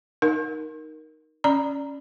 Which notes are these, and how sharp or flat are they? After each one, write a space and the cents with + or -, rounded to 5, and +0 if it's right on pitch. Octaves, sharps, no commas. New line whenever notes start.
D#4 +0 A#4 +5
C#4 +0 D5 +0 A#5 +0